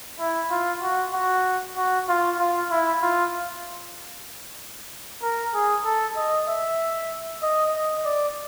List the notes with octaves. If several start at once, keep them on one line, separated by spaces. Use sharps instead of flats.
E4
F4
F#4
F#4
F#4
F4
F4
E4
F4
A#4
G#4
A4
D#5
E5
D#5
D#5
D5